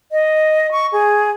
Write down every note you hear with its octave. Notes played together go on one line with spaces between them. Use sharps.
D#5
C#6
G#4